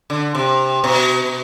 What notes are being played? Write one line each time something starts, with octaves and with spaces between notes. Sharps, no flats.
D3
C3
B2